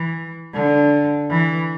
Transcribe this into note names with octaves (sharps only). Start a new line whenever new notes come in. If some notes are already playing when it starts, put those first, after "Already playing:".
Already playing: E3
D3
E3